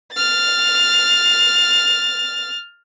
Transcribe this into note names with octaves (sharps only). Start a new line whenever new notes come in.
F6 A6